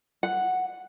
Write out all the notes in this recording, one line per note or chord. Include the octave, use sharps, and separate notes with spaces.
F#5